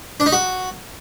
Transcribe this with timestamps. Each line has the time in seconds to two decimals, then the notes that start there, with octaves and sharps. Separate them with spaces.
0.20 D4
0.26 D#4
0.32 F#4